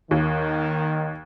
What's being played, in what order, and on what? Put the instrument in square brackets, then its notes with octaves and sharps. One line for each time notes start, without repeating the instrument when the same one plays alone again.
[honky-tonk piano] D#2 [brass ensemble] D#3